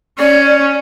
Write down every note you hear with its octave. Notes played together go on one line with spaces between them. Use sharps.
C#4 D5